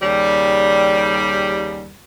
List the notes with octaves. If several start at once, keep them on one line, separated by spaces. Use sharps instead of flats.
D#2 C#3 G3